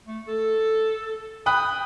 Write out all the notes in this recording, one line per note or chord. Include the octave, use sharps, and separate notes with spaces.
A3
A4
G5 B5 D#6 F#6